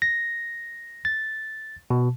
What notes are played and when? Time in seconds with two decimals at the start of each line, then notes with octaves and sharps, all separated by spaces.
0.02 A#6
1.05 A6
1.90 B2